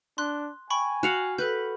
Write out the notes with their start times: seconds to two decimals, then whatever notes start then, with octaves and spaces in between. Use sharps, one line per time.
0.18 D4 C6 F#6
0.70 G5 G#5 B5 C#6
1.03 F#4 F5 F#5
1.39 A4 B4 F#6 G6